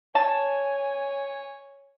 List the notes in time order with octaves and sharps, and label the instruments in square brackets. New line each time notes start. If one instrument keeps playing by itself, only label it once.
[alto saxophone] C#5 [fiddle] G#5 [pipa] A5